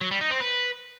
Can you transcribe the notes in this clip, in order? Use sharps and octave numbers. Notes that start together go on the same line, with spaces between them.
F#3
G3
D#4
C4
B4